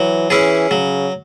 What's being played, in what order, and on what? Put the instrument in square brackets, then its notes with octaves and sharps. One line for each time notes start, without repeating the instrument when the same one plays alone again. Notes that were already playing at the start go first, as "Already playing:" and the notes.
Already playing: [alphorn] E3 [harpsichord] F#3
[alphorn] E3 [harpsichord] C#4 E4 G#4
[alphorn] C#3 [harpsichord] F#3